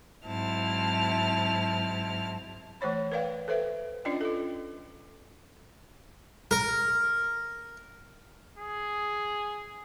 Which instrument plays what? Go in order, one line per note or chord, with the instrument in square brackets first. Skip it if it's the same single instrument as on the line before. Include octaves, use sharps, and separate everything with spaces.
[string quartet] G#2 F#3 C4 E4 A5 F6
[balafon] E3 A3 C5 C#5 B5
A#4 B4 D5 F5 G5
A4 B4 C5 E5
C#4 D4 F4 D5 D#5 G5
F4 A4
[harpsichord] A#4
[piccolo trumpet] G#4